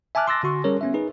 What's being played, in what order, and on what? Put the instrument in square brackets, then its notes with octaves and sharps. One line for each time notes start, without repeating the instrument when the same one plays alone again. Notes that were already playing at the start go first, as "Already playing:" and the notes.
[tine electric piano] E5 G#5 A5 D6 F6 F#6
C6 D6 E6 F#6 A6 A#6
D3 F#4 C6 C#6
G3 C#4 G#4 A#4 C#5
B3 C#4 E5
D#4 G#4 B4